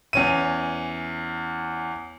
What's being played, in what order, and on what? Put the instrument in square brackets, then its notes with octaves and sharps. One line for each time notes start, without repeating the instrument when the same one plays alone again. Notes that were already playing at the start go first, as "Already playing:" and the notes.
[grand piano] E2 C#4 D#7